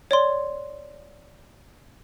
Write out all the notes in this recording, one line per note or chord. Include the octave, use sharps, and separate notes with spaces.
C#5 D5 C6